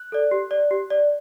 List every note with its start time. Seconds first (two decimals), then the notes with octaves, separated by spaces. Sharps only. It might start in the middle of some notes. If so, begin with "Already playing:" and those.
Already playing: F#6
0.12 A4 D5
0.31 G4
0.51 D5
0.71 G4
0.90 D5